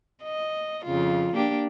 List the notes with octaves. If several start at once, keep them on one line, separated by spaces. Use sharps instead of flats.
D#5
F2 C#3 F4
A#3 D4 G4